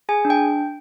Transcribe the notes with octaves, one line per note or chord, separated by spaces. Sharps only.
G#4 G#5
D4
G5